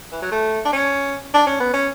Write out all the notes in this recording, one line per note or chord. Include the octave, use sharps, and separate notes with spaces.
E3
F#3
A3
D4
C#4
D4
C#4
B3
C#4